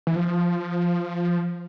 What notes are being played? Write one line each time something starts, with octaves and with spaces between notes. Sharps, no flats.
E3
F3